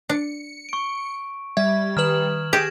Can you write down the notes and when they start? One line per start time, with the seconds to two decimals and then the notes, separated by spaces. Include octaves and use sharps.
0.09 D4 C#7
0.69 C#6 D7
1.57 G3 E5 G#6
1.97 D#3 B4 F6 E7 F#7
2.53 G4 G#4 G5 G#6 A#6 E7